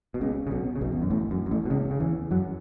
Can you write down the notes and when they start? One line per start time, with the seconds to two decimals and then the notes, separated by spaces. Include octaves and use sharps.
0.14 B2
0.21 C#2 C#3
0.47 C#3
0.51 B1 B2
0.76 C#3
0.81 B1 B2
0.92 E2
1.02 F#2
1.10 A1 A2
1.31 F#2
1.46 F#2
1.51 A1 A2
1.66 B2
1.70 C#2 C#3
1.91 C#3
2.00 E2 E3
2.31 F#2 F#3